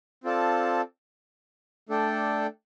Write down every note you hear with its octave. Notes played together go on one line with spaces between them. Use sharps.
C4 F4 A4 D5 A5
A3 D4 A4 D5 G5